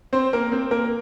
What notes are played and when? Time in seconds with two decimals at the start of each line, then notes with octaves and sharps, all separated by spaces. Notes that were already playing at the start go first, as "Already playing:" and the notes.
0.13 C4 C5
0.33 A#3 A#4
0.52 C4 C5
0.71 A#3 A#4